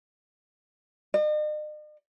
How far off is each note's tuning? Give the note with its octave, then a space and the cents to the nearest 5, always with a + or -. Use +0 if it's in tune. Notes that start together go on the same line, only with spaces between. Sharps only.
D#5 -45